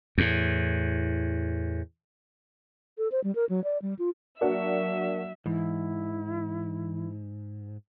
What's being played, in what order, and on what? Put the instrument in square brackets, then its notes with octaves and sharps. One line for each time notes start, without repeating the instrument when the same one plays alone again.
[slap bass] E2 A2
[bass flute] A4
C5
G3
A#4
F#3
D5
G3
F4
[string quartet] F#3 E5 [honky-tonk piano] A#3 D4 F#4
[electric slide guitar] G#2 [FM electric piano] E3 [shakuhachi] E4